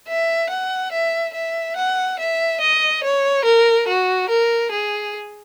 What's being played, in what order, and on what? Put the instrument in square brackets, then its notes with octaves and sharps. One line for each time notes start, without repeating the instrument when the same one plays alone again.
[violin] E5
F#5
E5
E5
F#5
E5
D#5
C#5
A#4
F#4
A#4
G#4